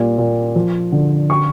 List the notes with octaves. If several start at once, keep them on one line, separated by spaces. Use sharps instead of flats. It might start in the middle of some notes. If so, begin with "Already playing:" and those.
Already playing: A#2 G3
A#2
F3
D3
C#6